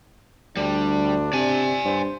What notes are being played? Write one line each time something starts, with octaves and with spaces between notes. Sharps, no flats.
D2 G3 D4
C3 D5 G#5
G2 C5